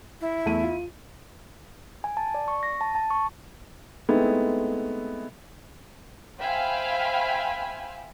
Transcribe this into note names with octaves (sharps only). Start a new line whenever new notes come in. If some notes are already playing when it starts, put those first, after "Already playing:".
E4
E2 A3 D#7
F4
G#5
A5
D5
C#6
A#6
A5
A5
C#6
G#3 A3 B3 C4 D#4 E4
C5 E5 F5 G5 G#5 B5